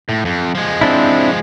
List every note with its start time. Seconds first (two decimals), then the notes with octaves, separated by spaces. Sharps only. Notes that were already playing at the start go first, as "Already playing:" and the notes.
0.09 A2
0.25 F2
0.55 F3 G#3
0.81 C4 D4 E4